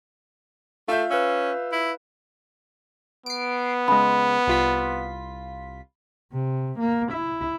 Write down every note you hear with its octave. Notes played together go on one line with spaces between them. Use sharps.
A3 F4 E5 G6
C#4 B4 F5 E6
E4
B3 C7 D7
C#3 G#3 B5
C2 F4 B6
C3
A#3
E4